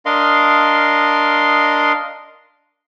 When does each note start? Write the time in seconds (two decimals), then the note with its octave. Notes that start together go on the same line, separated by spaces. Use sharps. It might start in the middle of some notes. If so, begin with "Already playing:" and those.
0.06 D4 A#4 D#5 F5 C6